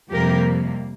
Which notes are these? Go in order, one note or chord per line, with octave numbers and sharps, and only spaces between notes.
F2 C3 G3 A#3 G4 A#4